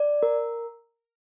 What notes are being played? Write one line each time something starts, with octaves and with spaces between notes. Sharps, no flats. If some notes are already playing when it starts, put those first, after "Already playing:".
Already playing: D5
A#4